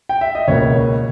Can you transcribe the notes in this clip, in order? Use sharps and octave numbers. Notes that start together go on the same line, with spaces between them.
G5
E5
D#5
C#2 B2 A#3 C#5